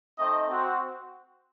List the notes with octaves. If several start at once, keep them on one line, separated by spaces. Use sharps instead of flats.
A3 C4 D#4 D#5
C4 F#4